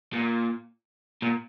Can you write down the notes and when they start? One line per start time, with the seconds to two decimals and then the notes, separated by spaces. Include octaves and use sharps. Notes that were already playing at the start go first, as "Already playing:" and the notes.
0.13 A#2
1.22 A#2